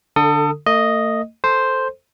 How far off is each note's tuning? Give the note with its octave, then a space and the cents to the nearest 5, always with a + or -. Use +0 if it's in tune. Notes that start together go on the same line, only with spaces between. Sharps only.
D3 +0 A4 +30 D#6 +0
A3 +45 D#5 +0
A4 +0 C5 +0